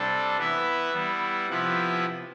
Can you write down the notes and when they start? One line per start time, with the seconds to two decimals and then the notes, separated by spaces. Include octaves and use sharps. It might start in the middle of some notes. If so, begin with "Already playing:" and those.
Already playing: C3 G3 D4 A4
0.37 E3 B3 E4 B4 E5
0.93 G3 B3 E4
1.49 C3 F3 B3 E4 B4